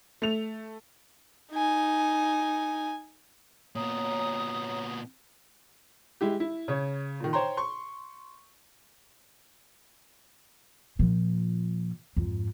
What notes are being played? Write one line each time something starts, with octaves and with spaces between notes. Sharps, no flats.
A3 F7
D#4 G#5
A#2 B3 C#5 A#5 D#6
G#3 E4 G4
E4
C#3 C#5
A#2 D#3
C5 C#5 G5 A#5 C6
C6 C#6
A#2 F3
F2 G#2